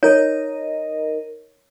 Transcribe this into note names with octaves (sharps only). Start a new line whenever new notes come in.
D#4 A#4 C#5 D#5